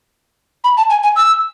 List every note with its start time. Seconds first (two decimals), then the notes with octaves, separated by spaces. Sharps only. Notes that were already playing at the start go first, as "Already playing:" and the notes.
0.64 B5
0.77 A5
0.90 G#5
1.03 G#5
1.16 E6